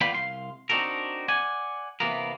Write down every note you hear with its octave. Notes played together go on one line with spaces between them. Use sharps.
B3 F4 D5 F5 G5 B5
C2 F5 C6
C4 D4 D#4 F#4 A4 A#4
D5 F#5 G#5
C3 E3 A#3 B3 A#4